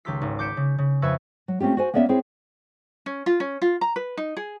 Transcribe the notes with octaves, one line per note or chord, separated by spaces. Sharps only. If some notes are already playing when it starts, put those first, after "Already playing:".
C#2 D#3 G4 C6 E6 B6
G#1
D6 G6 B6 C#7 D7 E7
C#3
C#3
F2 B4 E5 C#6 E6 G#6
F#3
A3 C4 C#4 F4 G4
F#4 C5 G#5
A#3 B3 C#4 D5 E5
C4 E4 G#4 C#5
C#4
F4
C#4
F4
A#5
B4
D#4
G#4